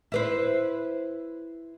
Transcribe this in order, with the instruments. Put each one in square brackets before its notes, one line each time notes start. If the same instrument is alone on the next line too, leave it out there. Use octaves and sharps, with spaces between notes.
[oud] E4 B4 C5